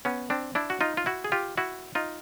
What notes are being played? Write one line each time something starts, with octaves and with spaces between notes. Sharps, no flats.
B3 C#4
C4 D4
D4 E4
F#4
D#4 F4
F4
E4 F#4
G#4
F4 G4
E4 F#4
D#4 F4